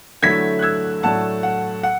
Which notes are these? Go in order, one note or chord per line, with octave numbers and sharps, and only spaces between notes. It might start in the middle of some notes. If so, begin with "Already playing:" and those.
D3 F#3 A3 E4 G#6 B6
F#6
E6 G#6
A2 F#3 A3 D4 F#5 A5
F#5
F#5